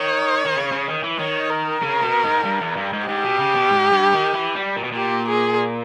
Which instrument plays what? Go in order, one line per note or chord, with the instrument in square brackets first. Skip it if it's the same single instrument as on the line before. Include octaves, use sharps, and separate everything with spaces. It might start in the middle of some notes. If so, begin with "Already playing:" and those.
Already playing: [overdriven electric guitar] D#3 [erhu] C#5
[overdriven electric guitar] D#3
C#3
C#3
D#3
E3
[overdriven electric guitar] D#3 [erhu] C#5
[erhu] A#4
[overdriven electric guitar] C#3
B2
G#2
G2
E2
G2
G#2
[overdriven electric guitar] G#2 [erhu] G4
[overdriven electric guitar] B2
C#3
B2
G#2
G2
D#3
E3
G3
A#2
B2
[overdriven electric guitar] A#2 [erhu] G4
[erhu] G#4